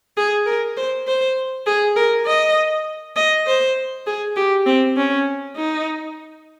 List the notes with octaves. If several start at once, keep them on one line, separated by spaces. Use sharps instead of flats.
G#4
A#4
C5
C5
G#4
A#4
D#5
D#5
C5
G#4
G4
C4
C#4
D#4